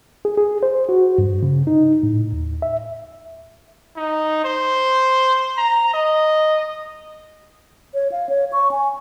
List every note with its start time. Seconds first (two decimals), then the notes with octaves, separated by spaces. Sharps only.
0.25 G#4
0.37 G#4
0.63 C5
0.89 F#4
1.18 G2
1.43 C#3
1.67 D#4
2.03 A2
2.32 D#2
2.62 E5
3.96 D#4
4.44 C5
5.57 A#5
5.94 D#5
7.94 C#5
8.12 F5
8.29 C#5
8.52 C#6
8.71 G#5